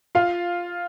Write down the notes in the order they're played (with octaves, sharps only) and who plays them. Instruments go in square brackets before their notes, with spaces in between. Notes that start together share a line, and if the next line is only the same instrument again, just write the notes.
[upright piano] F4 F5